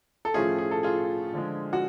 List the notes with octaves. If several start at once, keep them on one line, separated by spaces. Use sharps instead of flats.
A4
A2 F3 A3 C#4 F4 G#4
G#4
A4
F4 G#4
D3 F3 G#3
F#4